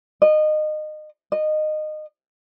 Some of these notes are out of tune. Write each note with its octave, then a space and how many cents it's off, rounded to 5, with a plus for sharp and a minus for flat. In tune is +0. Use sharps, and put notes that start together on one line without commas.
D#5 -25
D#5 -20